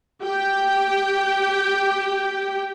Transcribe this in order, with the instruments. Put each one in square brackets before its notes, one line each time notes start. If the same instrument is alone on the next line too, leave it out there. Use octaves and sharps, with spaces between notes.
[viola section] G4 G5